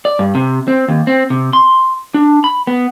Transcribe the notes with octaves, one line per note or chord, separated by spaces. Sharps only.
D5
G2
C3
C4
D#2
C4
C3
C6
D4
B5
B3